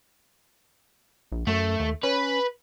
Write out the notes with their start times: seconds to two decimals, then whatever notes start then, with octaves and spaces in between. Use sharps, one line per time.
1.32 A#1
1.47 F#2 A3
1.80 D#2
2.03 C#4 B4